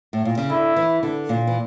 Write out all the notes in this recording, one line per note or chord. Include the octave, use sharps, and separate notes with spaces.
A2
A#2
C#3
D3 E4
E3
D3
A#2
E3